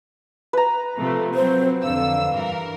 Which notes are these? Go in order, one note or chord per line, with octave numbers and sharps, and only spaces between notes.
B4 A#5
C3 F3 A3
F#3 C4 C5
F2 D3 F5 E6
G2 E3 A#4